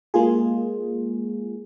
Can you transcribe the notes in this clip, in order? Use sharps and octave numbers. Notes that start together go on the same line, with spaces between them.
G#3 A#3 F4 G#4